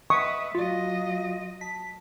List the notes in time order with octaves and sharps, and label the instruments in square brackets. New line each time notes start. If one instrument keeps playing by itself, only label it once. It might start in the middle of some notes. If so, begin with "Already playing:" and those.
[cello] B4 E5 [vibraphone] D#5 [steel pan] C#6 [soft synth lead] D#6
[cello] F#3 D#5 [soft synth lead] F4 [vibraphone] F#4 F5
[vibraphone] A5 [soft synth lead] B6